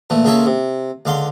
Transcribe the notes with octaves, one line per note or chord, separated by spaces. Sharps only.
A#2 E3 A3
C#2 A#3 F4 A4 C#5 E5
C3
C#2 D3 F5 C6